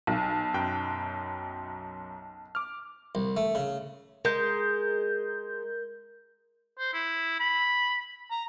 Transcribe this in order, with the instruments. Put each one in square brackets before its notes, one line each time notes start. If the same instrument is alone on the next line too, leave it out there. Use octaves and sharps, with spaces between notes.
[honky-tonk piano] B1
[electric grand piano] F#2 G5 F#6
D6 F6
[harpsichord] C2
A3
C#3
[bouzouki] G#3 [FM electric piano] A#4 G6
[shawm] C5
E4
B5
A#5